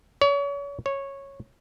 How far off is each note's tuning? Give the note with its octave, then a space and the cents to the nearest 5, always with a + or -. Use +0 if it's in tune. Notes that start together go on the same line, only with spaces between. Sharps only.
C#5 +35
C#5 -10